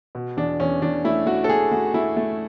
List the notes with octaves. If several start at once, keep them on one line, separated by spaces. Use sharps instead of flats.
B2
E2 D4
E2 C#4
E2 D4
A3 E4
A3 F#4
A4
A3 G#4
A3 F#4
A3 E4
A3